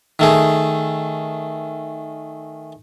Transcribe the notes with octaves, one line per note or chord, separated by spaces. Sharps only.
D#3 A3 G#4